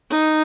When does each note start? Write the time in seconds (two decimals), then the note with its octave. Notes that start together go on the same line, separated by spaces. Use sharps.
0.11 D#4